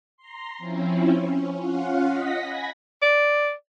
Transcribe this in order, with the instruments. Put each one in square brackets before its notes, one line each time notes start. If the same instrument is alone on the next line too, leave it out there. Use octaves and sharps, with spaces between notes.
[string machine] A#5 C6
F3 C4 C#4 E4
C#4
C#4 F4 F5 F#5
D#5 F#5 D#6 A#6 B6
G#5 B5 G#6 A#6
[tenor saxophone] D5